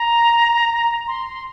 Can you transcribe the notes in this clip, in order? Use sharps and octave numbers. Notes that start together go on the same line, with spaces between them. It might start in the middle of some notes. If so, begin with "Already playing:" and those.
Already playing: A#5
C6